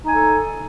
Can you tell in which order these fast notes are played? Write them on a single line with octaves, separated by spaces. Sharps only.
D#4 G#5 A4